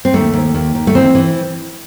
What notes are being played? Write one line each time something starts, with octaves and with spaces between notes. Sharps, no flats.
C4
D#2 A3
D#2
D#2
D#2
A3
E3 C4
E3